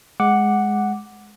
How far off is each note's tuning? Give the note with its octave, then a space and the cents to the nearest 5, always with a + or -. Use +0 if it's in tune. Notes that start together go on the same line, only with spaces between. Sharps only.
G#3 +0 F#5 +0 D6 +0